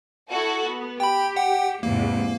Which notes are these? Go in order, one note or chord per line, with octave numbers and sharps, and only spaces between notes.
E4 F#4 A4
B3
G4 G5 B5
F#5 G5
E2 G#2 C3 A#3